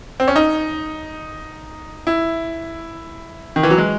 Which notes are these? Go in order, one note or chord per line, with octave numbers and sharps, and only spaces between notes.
C4
C#4
D#4
E4
D#3
E3
F#3
G#3